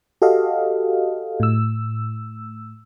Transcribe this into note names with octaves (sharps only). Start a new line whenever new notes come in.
F#4 G4 A4 D#5 F5
A2 E6